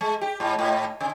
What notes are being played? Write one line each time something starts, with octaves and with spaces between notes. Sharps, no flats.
G#3
G4
G#2
G#2
C3